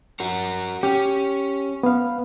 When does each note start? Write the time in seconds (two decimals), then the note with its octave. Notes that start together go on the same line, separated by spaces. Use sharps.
0.20 F#4 A#4
0.83 C#4 G4
1.83 B3 F5